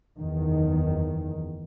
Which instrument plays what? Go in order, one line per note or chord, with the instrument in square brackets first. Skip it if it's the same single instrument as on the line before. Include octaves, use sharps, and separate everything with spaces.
[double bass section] F#1 E2 D#3